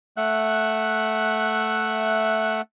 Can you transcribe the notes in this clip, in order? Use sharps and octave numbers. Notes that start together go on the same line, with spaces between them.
A3 E5 F#5 F#6